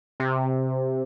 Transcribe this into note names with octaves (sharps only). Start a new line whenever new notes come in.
C3